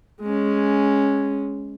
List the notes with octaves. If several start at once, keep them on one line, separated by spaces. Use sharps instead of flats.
G#3 C#4